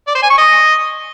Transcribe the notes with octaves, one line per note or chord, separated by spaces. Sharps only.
D5
C5
G#5
C#6
D#5